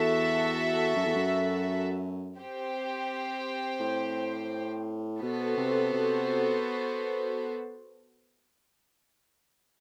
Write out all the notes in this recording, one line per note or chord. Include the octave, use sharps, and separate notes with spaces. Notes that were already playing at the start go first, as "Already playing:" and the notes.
Already playing: E2 F#4 A4 E5
F#2
E2
F#2
C4 G4 C5 G5
A2
B2 B3 F#4 A4 C5
C3
C3